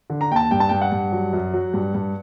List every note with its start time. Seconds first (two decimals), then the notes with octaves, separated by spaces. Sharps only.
0.10 D3
0.21 A#5
0.31 D#2 G5
0.36 A5
0.51 G2 G5
0.60 A5
0.69 G2 G5
0.81 F#5
0.92 G2
1.12 F#3
1.33 F#2
1.54 F#3
1.74 G2
1.94 G2